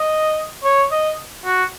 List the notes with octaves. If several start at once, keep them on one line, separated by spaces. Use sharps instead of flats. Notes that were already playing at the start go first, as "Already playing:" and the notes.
Already playing: D#5
C#5
D#5
F#4